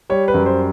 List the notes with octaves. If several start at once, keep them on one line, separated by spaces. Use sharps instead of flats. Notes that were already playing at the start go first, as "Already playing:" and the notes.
G3 C#5
B4
F#2
C5